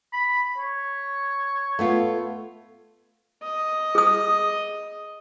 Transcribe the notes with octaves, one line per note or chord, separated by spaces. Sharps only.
B5
C#5
A3 B3 F4
D#5
G#4 D#6